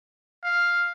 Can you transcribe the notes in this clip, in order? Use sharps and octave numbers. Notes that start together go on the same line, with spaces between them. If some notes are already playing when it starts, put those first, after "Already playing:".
F5